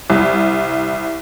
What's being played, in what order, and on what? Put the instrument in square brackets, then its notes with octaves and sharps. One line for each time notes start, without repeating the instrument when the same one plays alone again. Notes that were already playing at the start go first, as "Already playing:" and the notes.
[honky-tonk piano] C2